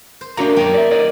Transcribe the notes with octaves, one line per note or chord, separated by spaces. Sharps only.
C5
A#3 D4 F#4 G4 A#5
F#2 A#3 D#4 G5 A#5
D5 E5
A#4 D5 D#5